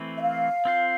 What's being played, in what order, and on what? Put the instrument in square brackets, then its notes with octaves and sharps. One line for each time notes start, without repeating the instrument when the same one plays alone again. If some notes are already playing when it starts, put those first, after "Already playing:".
Already playing: [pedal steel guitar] E3 A3 C4
[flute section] E5
F5
[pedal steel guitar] C4 F4 C5